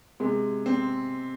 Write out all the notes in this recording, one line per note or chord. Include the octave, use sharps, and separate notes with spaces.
C3 G#3
C4